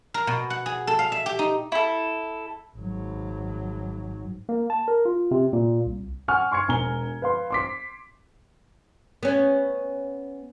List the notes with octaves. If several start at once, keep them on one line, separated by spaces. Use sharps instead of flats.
A#4
B2
F#5
G#4
A4
F5
E5
G4
D#4
E4 A4
G#1 F#3
A#3
A5
A#4
F4
C3
A#2
C2
F#5 G#5 C#6 F6
C6 C#6 G#6 C#7
E1 G#5 A#5 G7
B4 F5 C6
C6 D6 B6
B3 C#4